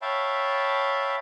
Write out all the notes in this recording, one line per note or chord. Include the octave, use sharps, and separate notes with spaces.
C#5 E5 F5 G5 A5 B5